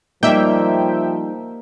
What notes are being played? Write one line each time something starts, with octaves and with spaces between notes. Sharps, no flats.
F3 G3 A#3 D#4 E5 G5